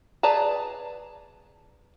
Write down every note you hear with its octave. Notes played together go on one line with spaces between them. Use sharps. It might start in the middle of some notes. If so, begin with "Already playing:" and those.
G#4 B4 D5 A5 A#5